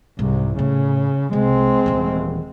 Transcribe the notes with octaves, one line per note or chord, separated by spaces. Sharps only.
C2 G#2
A2 C#3
C2 G#3 C4
D#1 E3